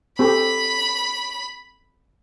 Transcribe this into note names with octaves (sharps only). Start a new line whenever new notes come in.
C4 G4 A4 B5